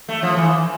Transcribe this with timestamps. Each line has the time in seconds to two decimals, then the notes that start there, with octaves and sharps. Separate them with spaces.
0.09 A3
0.23 F3
0.36 E3